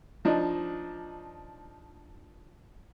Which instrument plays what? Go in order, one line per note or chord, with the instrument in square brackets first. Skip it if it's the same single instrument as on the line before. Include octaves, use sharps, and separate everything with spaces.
[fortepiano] F3 D4 D#4